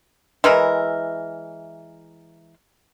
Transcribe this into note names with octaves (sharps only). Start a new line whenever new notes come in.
E3 G#3 E4 A#4